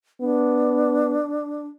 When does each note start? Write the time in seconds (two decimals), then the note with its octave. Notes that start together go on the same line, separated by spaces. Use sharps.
0.21 B3 D4